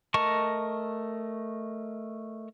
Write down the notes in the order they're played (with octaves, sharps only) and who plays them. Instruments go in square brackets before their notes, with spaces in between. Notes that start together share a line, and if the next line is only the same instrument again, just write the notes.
[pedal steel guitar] A3 A#4 D#5 A5 C#6